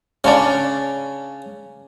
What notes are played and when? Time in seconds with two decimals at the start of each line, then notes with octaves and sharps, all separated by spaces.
0.24 C#3 C#4 D4 D5